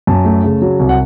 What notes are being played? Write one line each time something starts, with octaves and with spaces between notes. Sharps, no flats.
F#2 A5
A3
C#3
F#3
C2
F#5